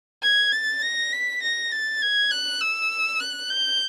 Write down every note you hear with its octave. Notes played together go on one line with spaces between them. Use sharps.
G#6
A6
A#6
B6
A#6
A6
G#6
F#6
E6
F#6
G6